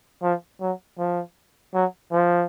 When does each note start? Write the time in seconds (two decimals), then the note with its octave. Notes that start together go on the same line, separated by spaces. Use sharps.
0.22 F3
0.61 F#3
0.98 F3
1.74 F#3
2.11 F3